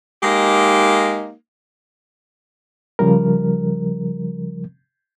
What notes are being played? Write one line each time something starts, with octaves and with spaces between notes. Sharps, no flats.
G#3 A#3 D#4 G4
C#3 F3 G3 A#4